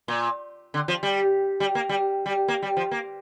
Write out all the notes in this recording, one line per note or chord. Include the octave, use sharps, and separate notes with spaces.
A#2
D3
F3
G3
G3
A#3
G3
G3
A#3
G3
F3
A#3